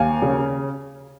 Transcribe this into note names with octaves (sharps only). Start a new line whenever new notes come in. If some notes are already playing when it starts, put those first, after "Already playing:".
Already playing: D#2 F5 G#5
C#3